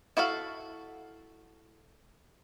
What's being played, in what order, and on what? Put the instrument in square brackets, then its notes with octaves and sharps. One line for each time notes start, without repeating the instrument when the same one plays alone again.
[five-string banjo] E4 F#4 A4 F5